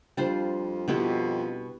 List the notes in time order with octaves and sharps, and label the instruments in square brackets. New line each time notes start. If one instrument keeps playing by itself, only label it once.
[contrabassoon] F2 [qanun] G3 D4 F4 C5
[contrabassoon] F2 [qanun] B2 B3 E4 G4